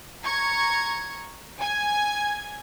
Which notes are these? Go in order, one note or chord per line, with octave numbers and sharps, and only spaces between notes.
A#5 C#6 G#6
G#5 G#6